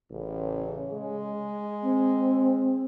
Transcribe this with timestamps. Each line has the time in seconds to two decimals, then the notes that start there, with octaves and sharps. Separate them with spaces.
0.10 A1 C#3
0.93 G#3
1.82 C4